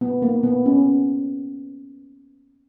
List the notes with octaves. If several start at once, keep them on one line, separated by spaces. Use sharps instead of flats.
B3
A#3
B3
C#4